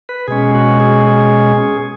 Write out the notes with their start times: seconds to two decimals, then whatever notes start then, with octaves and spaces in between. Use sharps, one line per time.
0.09 B4
0.28 B2 G#3 C#4 G#4
0.55 F#4
0.80 G#4
1.07 G#4